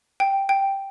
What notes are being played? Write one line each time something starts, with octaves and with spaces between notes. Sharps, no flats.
G5
G5